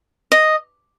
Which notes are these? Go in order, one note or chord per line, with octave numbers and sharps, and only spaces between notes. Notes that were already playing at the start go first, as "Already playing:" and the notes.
D#5